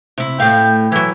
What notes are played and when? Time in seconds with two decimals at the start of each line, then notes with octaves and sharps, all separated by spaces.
0.18 C3 E4
0.40 A2 F5 G5
0.92 E3 F#3 E4